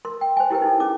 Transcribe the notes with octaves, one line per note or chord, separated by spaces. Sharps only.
A#4 C6
G5
C5 G#5
E4 G4 A#4 B4 G5
D#4 E4 A4
C#4 G#4 D6